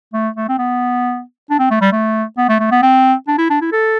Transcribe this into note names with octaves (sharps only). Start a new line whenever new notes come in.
A3
A3
C4
B3
D4
C4
A3
G3
A3
B3
A3
A3
B3
C4
D4
E4
D4
E4
A4